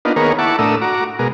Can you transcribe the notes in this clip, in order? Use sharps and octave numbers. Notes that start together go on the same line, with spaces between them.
A#3 B3 D4 D#4 F4
D#3 A#3 B3 G#4 A#4 C#5
E4 F#5 A5 C#6 D6
A2 A3 D4 A#4 D#6 E6
F#4 A#5 D6
B2 G#3 A#4